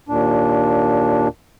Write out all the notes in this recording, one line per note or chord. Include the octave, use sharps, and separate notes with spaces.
D#2 A#2 D4